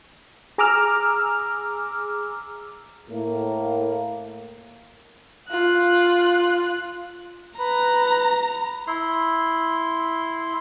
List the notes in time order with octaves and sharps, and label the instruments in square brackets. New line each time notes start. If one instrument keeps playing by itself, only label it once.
[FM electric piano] G#4 A#5 D6 E6 F6
[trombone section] A2 A#3
[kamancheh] F4 F#6
[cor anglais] B4 [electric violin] A#5
[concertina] E4 C6